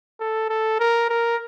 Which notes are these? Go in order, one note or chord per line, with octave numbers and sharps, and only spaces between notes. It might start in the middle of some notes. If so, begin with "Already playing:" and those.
A4
A4
A#4
A#4